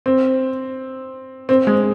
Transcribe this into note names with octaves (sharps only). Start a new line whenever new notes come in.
C4
C4
G#3